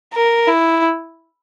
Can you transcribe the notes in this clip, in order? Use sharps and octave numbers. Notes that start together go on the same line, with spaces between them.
A#4
E4